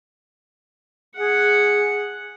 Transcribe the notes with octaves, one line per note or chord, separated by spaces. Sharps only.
G#4 F#5